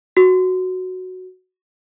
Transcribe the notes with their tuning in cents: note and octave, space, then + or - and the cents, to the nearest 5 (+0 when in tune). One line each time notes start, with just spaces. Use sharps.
F#4 +0